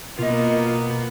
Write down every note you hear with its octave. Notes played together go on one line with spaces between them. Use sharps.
B2 A#3 B3 F4 A#4 D#5